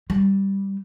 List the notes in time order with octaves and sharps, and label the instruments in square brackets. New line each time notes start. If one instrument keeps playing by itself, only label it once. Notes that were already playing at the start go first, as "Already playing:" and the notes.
[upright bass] G3